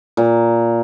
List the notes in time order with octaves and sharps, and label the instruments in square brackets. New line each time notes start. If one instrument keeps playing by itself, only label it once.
[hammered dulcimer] A#2